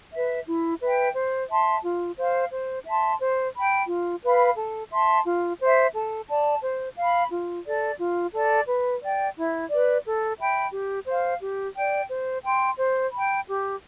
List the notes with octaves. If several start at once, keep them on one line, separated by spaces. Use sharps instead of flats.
B4 E5
E4
B4 E5 G5
C5
E5 A5 C6
F4
C5 F5
C5
E5 A5 C6
C5
G5 B5
F4
B4 F5 B5
A4
E5 A5 C6
F4
C5 E5
A4
D5 A5
C5
F5
B5
F4
A4 D5
F4
A4 D5
B4
D5 G5
E4
B4 D5
A4
E5 G5 B5
G4
C5 F5
G4
D5 G5
C5
G5 C6
C5
G5 B5
G4